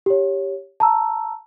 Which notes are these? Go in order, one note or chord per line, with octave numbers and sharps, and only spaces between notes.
G4 C#5
A5 A#5 E6